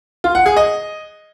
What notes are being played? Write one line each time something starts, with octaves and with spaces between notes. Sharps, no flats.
F4
F#5
G#4
D#5